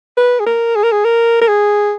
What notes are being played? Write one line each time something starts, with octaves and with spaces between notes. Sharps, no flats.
B4
G#4
A#4
G#4
A#4
G#4
A#4
A#4
G#4